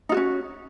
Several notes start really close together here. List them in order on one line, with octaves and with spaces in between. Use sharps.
D#4 F4 F#4 C#4